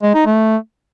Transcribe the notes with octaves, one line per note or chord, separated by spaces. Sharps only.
G#3
D#4
A3